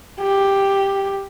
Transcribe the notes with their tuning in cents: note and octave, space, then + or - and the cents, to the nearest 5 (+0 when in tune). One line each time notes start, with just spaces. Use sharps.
G4 +5